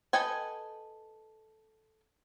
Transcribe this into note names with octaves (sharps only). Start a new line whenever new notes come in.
A4 B4 D#5 G5 G#5